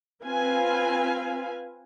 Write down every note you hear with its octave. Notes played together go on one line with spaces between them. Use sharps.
C4 F4 B4 F5 G#5